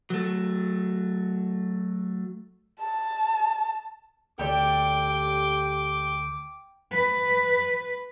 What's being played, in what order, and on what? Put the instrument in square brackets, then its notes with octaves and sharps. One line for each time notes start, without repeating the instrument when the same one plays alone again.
[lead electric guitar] F#3 A3
[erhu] A5
[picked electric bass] D2 [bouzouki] G4 A4 D5 [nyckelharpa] G5 [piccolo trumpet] D6
[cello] B4